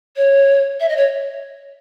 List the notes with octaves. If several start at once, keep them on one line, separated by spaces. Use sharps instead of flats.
C#5
E5
D#5
C#5